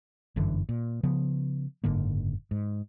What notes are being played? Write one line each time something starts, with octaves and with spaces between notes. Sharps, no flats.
G1 F#2 D3 E3
A#2
C#3 F3 B3
F#1 G#2 D3 A#3
G#2